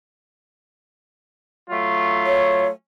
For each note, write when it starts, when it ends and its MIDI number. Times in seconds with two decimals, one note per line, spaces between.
1.70 2.68 54
1.70 2.68 57
1.70 2.68 65
2.26 2.68 73